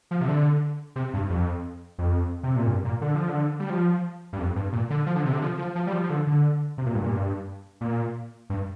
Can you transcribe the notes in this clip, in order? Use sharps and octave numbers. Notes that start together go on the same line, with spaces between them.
F3
C3
D3
C3
G2
F2
F2
C3
A#2
G2
A#2
D3
F3
D3
G3
F3
G2
F2
G2
A#2
D3
F3
D3
C3
D3
F3
F3
F3
G3
F3
F3
D3
D3
C3
A#2
G2
A#2
G2
A#2
G2